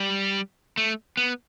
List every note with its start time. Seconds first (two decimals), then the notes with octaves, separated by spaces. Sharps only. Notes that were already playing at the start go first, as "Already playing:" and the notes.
Already playing: G3
0.77 A3
1.17 B3